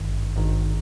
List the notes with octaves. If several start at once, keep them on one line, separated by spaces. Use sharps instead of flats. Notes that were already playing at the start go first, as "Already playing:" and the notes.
Already playing: G#1 G2 D#3
G#1 G2 D#3